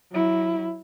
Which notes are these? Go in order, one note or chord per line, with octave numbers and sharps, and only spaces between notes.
F#3 E4